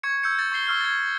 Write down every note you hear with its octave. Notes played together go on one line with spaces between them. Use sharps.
C#6 G#6 C#7
E6 G6 C#7
G6 A6 C#7
C#6 A6 C7 G7
C#6 E6 F6 G7
G#6 A6